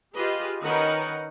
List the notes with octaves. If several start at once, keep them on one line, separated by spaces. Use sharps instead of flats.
F4 G4 G#4 B4 D#5
D#3 C#4 D#4 A#4 B4 F#5